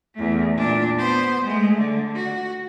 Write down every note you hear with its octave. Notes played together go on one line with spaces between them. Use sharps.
E2 A3
A#2 D4
B3 C5
G#3 A3
D3
F#4